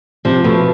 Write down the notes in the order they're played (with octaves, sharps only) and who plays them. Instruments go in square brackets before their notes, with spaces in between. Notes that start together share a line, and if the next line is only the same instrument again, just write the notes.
[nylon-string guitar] C3 [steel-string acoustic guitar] F3
[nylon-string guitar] B2 [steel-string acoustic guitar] A3